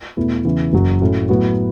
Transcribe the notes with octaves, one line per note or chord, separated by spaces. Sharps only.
E2 B2 A3 E4
E2 C#3 E3
F#1 F#2 F#3
A2 A3 C#4 F#4
A2 F#3 B3 F#4